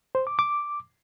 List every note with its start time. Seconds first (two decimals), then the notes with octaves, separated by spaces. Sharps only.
0.15 C5
0.27 D6
0.39 D6